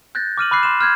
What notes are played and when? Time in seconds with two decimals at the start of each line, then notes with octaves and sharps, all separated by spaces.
0.15 F#6 G6 A6 A#6
0.38 D6 F6 D#7 F#7
0.51 B5 D6 F#6 C7
0.63 C6 E7
0.81 F6 G6 G#6